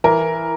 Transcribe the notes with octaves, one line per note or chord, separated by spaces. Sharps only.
E3 A#4